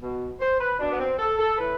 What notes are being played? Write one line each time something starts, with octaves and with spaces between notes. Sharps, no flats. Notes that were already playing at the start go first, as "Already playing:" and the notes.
B2
C5
B4
B2 D4
B3
C4
A4
A4
A2 E3 B4